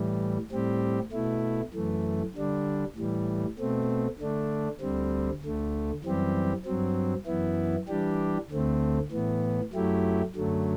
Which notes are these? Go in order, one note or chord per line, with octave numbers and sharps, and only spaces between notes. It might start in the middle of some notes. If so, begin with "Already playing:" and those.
Already playing: A2 E3 G3
A2 G3 C4 G4
B2 A3 E4
F#2 E3 A3
D3 G3 D4
A2 E3 G3
B2 A3 C4
D3 A3 D4
D2 D3 G3 C4
D2 D3 A3
F#2 E3 G3 C4 G4
G2 F#3 C4
F#2 E3 B3 E4
E3 G3 D4 G4
D2 D3 A3 C4
A2 E3 B3
F#2 F#3 A3 E4 G4
F#2 D3 F#3 A3